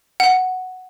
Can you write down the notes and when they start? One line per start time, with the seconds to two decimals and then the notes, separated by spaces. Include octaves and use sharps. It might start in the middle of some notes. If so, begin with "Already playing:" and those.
0.20 F#5